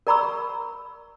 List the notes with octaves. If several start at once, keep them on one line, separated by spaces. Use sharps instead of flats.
A#4 D5 A#5 B5 C#6 E6